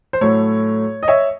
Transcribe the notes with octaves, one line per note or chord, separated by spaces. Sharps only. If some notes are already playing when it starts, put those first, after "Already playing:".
C5
A2 F#3 A3 C#5
D#5
C#5 E5